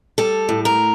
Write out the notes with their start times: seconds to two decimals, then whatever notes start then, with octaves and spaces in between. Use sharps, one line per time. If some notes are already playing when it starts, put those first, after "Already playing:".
0.18 G3 A4
0.49 A2
0.65 A#4